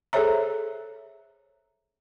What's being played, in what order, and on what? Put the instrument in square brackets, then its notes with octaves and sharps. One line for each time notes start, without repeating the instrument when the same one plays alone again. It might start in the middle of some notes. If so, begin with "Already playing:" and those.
[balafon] G#4 A4 C5 C#5 E5 A#5